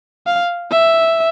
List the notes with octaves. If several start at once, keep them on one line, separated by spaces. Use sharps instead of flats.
F5
E5